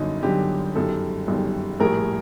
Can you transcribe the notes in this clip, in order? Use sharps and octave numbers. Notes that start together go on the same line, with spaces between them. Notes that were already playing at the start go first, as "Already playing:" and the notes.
Already playing: G1 F#2 D3 F#3 D#4
G1 F#2 D3 F#3 G4
G1 F#2 D#3 G3 A4
G1 F#2 D#3 G3
A#1 A2 G3 A#4